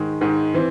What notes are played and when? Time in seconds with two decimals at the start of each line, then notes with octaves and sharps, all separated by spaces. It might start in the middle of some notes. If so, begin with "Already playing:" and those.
Already playing: G#2 D#3 G#3
0.21 G#2 D#3 G#3
0.54 E3 C4